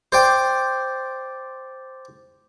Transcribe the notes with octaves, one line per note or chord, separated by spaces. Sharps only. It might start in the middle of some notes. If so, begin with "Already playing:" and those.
C5 D5 G5